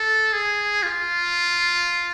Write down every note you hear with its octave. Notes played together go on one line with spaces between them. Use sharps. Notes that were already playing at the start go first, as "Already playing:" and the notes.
Already playing: A4
G#4
F4